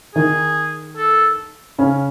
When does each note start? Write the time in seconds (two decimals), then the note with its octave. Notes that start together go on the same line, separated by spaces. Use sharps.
0.15 D#3 D#4 G#4
0.97 A4
1.79 C#3 C#4